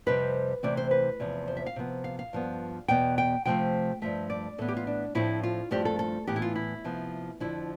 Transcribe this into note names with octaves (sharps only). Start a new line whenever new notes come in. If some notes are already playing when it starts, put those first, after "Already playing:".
F2 C3 G3 C4 B4
C3 E3 A3 C4 D5
C5
B4
E2 C3 F3
C5
E5
F5
C3 F3 B3
F5
F5
G2 F3 B3
E2 B2 B3 G5
G5
C3 F3 A3 C4 G5
G2 F3 A3 E5
D5
A2 E3 B3 A4
G4
F4
D4
A2 F3 A3 C4 E4
F4
G2 F3 A3 C4 G4
A4
A4
A2 E3 B3 G4
E4
F4
E4
C3 F3 B3
F2 D3 F3 E4